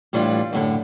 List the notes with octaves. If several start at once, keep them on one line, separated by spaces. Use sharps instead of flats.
A2 E3 G3 D4 F4
F#2 A2 D3